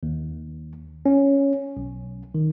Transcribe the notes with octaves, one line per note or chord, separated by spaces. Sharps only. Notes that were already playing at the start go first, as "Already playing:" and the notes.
D#2
C#4
B1
D#3